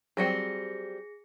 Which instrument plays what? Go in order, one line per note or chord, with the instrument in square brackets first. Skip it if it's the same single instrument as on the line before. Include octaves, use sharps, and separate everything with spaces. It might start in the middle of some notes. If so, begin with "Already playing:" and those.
[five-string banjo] F#3 G3 C4 [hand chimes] G#4 A#6 C#7